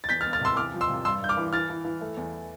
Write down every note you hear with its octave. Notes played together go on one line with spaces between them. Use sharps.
A6
E2 G6 B6
F6 A6
B3
F6 A6
C3 C6 E6
E2 D6 F6
F3
C6 E6
C3
G2 C6 E6
G2 G6
D6 F6
E3
E3 F6 A6
E3
E3
A3
E2